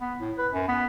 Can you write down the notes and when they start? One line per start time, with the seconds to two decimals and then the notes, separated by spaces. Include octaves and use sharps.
0.01 B3
0.20 A2
0.38 B4
0.52 F#2
0.68 B3